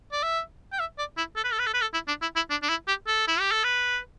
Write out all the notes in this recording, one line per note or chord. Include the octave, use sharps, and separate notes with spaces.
D5
E5
G5
E5
D5
E4
A4
B4
A4
B4
A4
B4
A4
E4
D4
E4
E4
D4
D4
E4
G4
A4
E4
G4
A4
B4